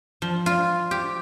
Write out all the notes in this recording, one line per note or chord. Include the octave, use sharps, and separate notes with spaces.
F3
F4
G4